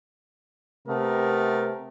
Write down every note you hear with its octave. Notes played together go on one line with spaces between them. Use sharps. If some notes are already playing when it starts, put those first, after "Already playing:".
C3 A3 B3 A#4